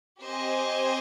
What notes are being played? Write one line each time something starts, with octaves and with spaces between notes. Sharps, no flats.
C4 G4 C5 D#5 G#5